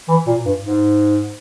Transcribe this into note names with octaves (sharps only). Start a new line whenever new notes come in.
E3
A#2
G2
G#2